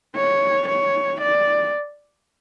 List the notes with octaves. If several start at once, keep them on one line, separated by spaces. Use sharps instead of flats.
C#5
C#5
D5